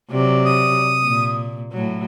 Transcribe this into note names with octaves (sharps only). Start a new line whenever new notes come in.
C3 F#3 D5
D#6
A#2
A2 F#3